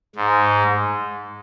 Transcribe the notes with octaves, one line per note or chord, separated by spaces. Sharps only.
G#2